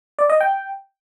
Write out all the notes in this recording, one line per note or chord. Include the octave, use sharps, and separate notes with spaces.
D5
D#5
G5